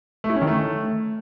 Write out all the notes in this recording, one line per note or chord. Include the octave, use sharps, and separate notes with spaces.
A3
E4
C#4
D#3
A3